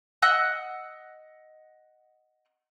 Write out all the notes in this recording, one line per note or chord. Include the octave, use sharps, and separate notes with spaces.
D#5 F#5 E6 F#6